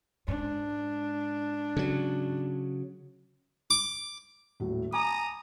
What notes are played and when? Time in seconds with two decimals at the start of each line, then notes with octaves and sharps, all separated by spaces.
0.28 G#2 D4
1.76 C#3 F#3
3.70 D6
4.60 D#1 A2 F#3
4.93 G#5 A#5 D6 D#6